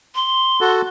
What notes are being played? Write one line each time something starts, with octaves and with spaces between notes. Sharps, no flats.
C6
F#4 A4